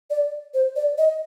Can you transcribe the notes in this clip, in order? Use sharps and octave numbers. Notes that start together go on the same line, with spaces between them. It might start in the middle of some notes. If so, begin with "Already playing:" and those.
D5
C5
D5
D#5